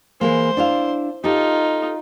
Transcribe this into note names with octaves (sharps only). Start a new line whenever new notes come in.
E3 G#3 A#3 C5
D4 E4 F5
D#4 F4 G4 A4